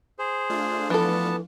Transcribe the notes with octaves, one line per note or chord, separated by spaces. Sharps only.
G#4 C5
A3 D4 F4
E3 F3 B3 A4 A5